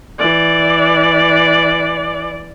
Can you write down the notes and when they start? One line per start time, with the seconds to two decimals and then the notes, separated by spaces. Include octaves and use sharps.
0.19 E3 D5